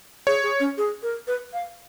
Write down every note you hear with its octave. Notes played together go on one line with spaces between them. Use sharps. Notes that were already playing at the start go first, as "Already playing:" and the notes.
G#4 C#5
G#4
C#4
G#4
A#4
B4
F5